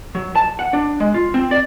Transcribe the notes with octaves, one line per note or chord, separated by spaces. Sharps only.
F#3
A5
F#5
D4
G#3
F4
C4
D5